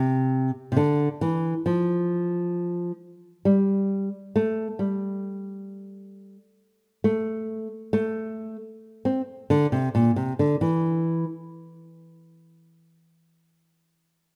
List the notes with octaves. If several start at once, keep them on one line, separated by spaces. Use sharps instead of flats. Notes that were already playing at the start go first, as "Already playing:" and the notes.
Already playing: C3
C3
D3
E3
F3
G3
A3
G3
A3
A3
C4
D3
C3
A#2
C3
D3
E3